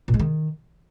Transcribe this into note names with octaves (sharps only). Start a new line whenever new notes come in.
A#2
G#3
D#3